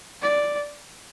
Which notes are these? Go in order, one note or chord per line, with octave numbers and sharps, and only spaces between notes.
D5